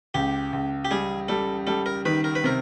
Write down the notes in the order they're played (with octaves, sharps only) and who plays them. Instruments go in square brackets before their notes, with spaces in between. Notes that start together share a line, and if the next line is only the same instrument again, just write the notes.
[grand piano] C#2 [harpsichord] G4
[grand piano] C#2
[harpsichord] G4
[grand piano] G3 [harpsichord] G#4
[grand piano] G3 [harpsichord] A4
[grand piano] G3 [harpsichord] A4
[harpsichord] A#4
[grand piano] D#3 [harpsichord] B4
[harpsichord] A#4
B4
[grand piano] C3 [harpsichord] A#4